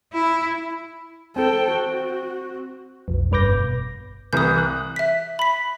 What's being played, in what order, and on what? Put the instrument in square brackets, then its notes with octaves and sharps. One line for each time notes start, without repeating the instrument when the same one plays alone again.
[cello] E4
[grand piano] C4 [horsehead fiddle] A4 G5
[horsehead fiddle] F#4
[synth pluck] B1 F2
G1 G2 B4 D6 G6 A#6
B2
[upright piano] C2 E3 [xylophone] D#6 G6
[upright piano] F#6
[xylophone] E5 B6
B5 B6